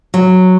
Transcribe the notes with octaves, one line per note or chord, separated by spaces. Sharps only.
F#3